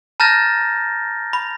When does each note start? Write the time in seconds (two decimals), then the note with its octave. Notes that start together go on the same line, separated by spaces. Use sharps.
0.20 A5 A#5 F6 G6 A6 A#6
1.33 B5